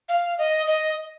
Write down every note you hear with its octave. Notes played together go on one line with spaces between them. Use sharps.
F5
D#5
D#5